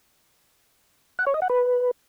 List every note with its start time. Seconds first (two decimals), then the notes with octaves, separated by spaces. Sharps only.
1.19 F#5
1.27 C#5
1.34 D#5
1.42 F#5
1.50 B4